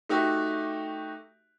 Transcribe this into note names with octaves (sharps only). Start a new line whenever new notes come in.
A3 D#4 F#4 G4 E5